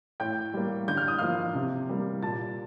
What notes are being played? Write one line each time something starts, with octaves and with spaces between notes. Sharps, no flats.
A2 G5 G6
G3 A#3
D3 G6
F6
D#6
F3 A#3 F5 F6
C3
G3 A#3
A#2 A5 A6